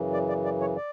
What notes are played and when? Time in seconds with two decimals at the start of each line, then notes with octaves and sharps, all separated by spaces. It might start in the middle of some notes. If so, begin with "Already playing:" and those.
Already playing: F#2 C#3 E3
0.13 D5
0.29 D5
0.45 D5
0.61 C#5
0.76 D5